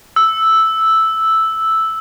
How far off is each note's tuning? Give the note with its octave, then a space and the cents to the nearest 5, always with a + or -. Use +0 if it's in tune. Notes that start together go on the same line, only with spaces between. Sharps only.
E6 -5